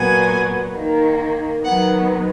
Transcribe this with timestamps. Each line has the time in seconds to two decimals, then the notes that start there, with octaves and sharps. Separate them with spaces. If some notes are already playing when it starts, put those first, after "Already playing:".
Already playing: A#2 F#3 B3 G#5
0.73 D#3 A#3
1.63 D#3 F#3 B3 F#5